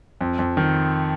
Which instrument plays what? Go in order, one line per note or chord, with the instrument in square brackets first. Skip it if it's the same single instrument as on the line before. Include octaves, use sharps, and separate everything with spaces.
[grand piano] F2
F2
D#3